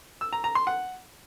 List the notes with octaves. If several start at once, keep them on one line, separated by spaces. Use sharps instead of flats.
E6
A#5
A#5
C6
F#5